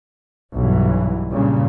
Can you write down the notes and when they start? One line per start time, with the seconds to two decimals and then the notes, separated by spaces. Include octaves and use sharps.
0.55 B1 G2 E3
1.31 G2 A#2 C#3